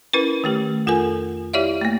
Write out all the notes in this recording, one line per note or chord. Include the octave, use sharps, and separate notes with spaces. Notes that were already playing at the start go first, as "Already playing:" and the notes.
C#4 E4 A#4 B4
D#3 A3 G4
F2 F4 A4 A#4 G#5
E4 G4 C#5 D5 E5 F5
A3 A#3